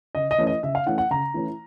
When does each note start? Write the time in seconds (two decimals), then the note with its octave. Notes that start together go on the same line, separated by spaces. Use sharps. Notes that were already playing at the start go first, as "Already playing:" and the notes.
0.15 C#3 D#5
0.31 D#5
0.38 E3 A3 C#4 E4
0.47 D#5
0.63 C#3 E5
0.75 F5
0.86 E3 A3 C#4 E4 F#5
0.98 F#5
1.11 C#3 A#5
1.34 E3 A3 C#4 E4